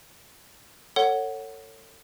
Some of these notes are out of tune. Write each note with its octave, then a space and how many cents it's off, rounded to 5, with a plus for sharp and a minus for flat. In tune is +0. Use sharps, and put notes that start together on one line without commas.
A4 +35 C#5 -5 F#5 +5